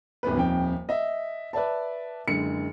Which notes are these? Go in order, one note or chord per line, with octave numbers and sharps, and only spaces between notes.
D#1 G#1 B3 B4
D#1 F2 G5
D#5 E5
B4 D5 E5 A5
F#1 D3 G#3 C#7